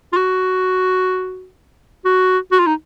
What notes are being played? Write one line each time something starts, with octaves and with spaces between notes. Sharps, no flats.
F4
F#4
F#4
F#4
F4
D#4